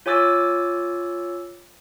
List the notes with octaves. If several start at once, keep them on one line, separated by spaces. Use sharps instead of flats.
F4 C#5 G#5 D6 E6 A6